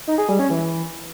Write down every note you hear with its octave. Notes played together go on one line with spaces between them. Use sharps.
D#4
G#4
G3
C#4
E3